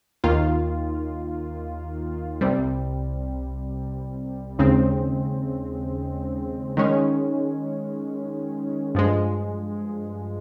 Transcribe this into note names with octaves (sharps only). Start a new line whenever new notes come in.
D#2 D#3 A#3 F4
C2 C3 G3
D#2 C#3 G#3 C4
D#3 G#3 C#4
G2 F3 G#3